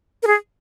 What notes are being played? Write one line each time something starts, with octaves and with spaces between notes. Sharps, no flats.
A#4
G#4